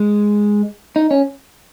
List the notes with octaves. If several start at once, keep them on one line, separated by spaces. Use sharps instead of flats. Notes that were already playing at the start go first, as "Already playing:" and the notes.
Already playing: G#3
D#4
C#4